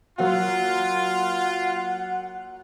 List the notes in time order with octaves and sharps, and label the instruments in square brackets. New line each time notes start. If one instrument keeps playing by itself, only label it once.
[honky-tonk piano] F#3 A#3 F#4 [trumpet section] F4 [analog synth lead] F#5